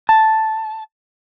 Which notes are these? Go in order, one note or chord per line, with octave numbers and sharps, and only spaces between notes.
A5